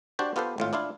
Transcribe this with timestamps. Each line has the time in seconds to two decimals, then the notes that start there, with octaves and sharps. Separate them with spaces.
0.19 D4 F#4 G4 C5 D5
0.36 B3 F4 G4 A4 B4 C5
0.58 G#1 A2 F4
0.73 D4 E4 F4 F5